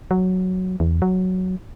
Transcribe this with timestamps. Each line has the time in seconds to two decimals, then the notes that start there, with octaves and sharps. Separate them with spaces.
0.11 F#3
0.80 E2
1.02 F#3